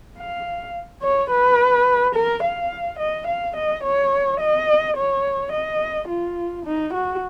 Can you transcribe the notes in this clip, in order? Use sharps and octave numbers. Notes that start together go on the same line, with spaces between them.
F5
C#5
B4
A#4
F5
D#5
F5
D#5
C#5
D#5
C#5
D#5
F4
D#4
F#4